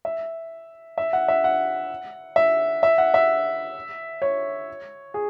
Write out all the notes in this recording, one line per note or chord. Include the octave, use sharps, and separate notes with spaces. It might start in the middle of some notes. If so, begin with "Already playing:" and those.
E5
E5
F#5
E5
F#5
E5
E5
F#5
E5
C#5
G#4